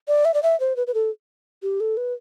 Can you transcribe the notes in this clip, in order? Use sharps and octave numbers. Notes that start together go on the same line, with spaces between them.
D5
E5
D5
E5
C5
B4
B4
A4
G4
A4
B4